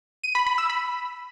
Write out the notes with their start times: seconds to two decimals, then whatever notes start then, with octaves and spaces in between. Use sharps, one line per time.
0.24 D#7
0.35 B5
0.47 B5
0.58 E6
0.70 B5